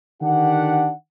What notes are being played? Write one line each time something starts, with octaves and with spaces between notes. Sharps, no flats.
D3 D#3 D4 G4 F#5